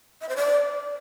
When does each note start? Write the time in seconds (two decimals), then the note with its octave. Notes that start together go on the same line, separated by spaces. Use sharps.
0.21 E5
0.29 C5
0.36 D5